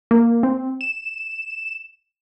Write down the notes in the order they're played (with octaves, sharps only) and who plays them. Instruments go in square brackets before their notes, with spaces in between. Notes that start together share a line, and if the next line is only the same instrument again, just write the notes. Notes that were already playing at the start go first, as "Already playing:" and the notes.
[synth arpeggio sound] A#3
C4
E7